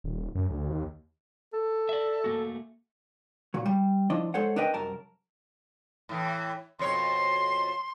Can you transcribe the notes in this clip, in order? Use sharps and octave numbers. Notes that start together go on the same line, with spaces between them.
D#1
F#2
D2
D#2
A4
D5 E5
A3 A#3 F#4
A#2 F#3
G3
F3 D4 E4 D#5
G#3 A4 C5 C#5 F#5
D4 A#4 B4 D#5 G5
C2 F#2 A#4 A5
A2 E3
F2 B2 C#5 C6